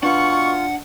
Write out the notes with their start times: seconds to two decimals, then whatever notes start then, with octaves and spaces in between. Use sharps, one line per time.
0.03 B2 D4 F4 F#5 C#6